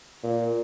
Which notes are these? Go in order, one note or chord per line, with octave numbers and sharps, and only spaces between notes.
A#2